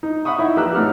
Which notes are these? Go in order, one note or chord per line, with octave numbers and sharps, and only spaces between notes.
D#4
E5 F#5 B5 C#6 D#6
D#4 E4 E5
A#1 G4 B4 A#5 E6 F#6
A2 D#4 F#5 F6